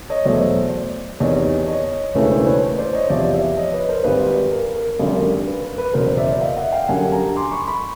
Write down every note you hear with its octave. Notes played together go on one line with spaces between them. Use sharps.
C#5 D#5
E2 B2 F#3 A3 C5 D5
E2 C3 D#3 C#5 D#5
C#5 D#5
E1 D#2 C#3 E3 A3 B4 C#5
C5 D5
B4 C#5
C5 D5
C#5 D#5
E2 C3 F3 D5 E5
D5 E5
C#5 D#5
B4 C#5
A#4 C5
G#1 G#2 D#3 G3 B4
A#4
A#4
G#1 F#2 D3 G3
B4
B4
B4
F#1 E2 B2 A#4 C5
D5 E5
D#5 F5
E5 F#5
F5 G5
F#2 D3 G3 F#5 G#5
G#5 A#5
C6 D6
B5 C#6
B5 C#6